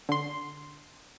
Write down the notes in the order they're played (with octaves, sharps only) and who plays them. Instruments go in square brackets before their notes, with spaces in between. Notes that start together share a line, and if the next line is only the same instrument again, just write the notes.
[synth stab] D3 C6